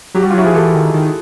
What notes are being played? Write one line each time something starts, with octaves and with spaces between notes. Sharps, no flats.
F#3 G4
F#4
G3
F4
F#3 E4 F#4
F3 G#4
E3 G4 A4
D#3
D#3